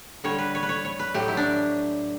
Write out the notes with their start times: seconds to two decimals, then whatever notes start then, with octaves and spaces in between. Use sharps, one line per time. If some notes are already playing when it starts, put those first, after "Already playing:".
0.24 D3 G3 C#5
0.38 B4
0.55 C#5
0.63 B4
0.69 C#5
0.85 C#5
0.99 B4
1.14 A2 F#3 A3 G4
1.28 E4
1.37 D4